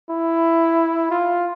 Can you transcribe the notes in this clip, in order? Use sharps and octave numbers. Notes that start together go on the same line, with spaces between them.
E4
F4